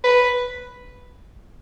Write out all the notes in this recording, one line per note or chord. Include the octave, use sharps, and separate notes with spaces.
B4